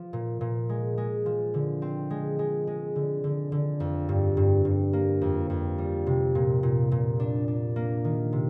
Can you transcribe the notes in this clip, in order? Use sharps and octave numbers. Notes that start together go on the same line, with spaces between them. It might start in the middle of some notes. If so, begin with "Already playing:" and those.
Already playing: F3
A#2
A#2
G#3
G#3
F3
D3
C4
G#3
G#3
G#3
D3
D3
D3
F2
G2
G2
G2
A#3
F2
F2
G3
C3
A#2
A#2
A#2
D4
D4
A#3
D#3
C3